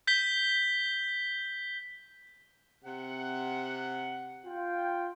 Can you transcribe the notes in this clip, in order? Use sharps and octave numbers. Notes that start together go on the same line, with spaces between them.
G6 B6 G7
C3 F#5
F4 G5